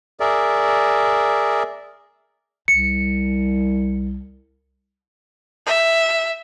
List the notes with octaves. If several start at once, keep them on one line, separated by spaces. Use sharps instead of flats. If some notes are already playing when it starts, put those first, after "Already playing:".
G#4 A#4 D5 E5
C2 C#7
E5